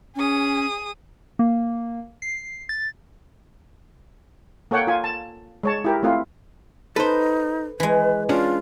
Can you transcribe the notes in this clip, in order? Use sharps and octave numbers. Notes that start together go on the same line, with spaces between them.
C#4 G#4 D#6
A#3
C7
A6
A#3 A4 C#5 F#5 G5
F4 G#5
A5
G#3 C#5 A5
E4 G4 A#4
A3 C4 E4 F4
D#4 A4 B4 C5
E3 G#3 B4
C#4 D4 F4 G#4